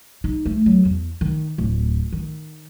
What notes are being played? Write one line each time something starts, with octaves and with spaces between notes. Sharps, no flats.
D#4
A3
F#3
E2
D#3
D1
D#3